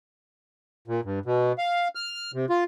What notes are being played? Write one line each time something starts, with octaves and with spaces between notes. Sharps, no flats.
A#2
G2
B2
F5
F6
C3
F4